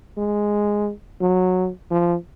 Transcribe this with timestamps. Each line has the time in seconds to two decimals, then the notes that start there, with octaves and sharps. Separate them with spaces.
0.17 G#3
1.21 F#3
1.90 F3